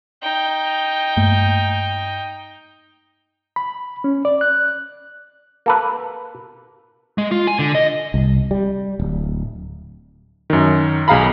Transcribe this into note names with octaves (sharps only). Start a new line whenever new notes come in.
D#4 G5
G2 A3 A#3
B5
C#4
D5
F#6
A#3 A4 B4
G#3
F4
G#5
D3
D#5
C2
G3
D1
F#2 D#3
B1 G#4 F5 A#5 B5